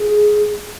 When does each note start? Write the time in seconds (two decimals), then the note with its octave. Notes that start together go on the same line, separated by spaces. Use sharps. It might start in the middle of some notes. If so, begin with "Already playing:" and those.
Already playing: G#4